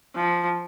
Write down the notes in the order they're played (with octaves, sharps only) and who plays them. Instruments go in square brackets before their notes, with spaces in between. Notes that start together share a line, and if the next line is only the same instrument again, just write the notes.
[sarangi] F3